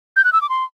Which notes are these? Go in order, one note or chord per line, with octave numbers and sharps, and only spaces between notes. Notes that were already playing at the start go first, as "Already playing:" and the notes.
G6
F#6
E6
D6
C6